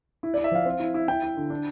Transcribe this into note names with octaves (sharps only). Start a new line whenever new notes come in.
E4
D5
E4
E5
F3 F5
C4
E4
E4
E4 G5
E4
D3
D4